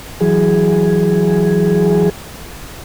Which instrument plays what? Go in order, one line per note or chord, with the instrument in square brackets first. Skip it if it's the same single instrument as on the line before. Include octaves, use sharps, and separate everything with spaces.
[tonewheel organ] E3 F#3 G#4